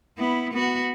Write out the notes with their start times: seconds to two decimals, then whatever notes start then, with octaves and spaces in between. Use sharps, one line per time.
0.18 B3 E4
0.53 B3 F#4